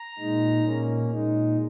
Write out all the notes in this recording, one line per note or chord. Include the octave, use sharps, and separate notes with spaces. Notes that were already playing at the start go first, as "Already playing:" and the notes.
Already playing: A#5
A#2 G#3 D#4
A#2 A#3 C#4
A#2 G#3 D#4